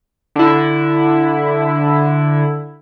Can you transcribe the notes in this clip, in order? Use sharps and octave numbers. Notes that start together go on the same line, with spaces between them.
D3 E4